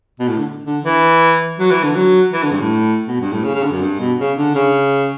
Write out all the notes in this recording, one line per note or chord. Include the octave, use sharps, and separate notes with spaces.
B2
A2
D3
D3
E3
F#3
E3
D3
F#3
E3
D3
G2
A2
B2
G2
A2
C#3
C#3
D3
F#2
G2
B2
C#3
D3
C#3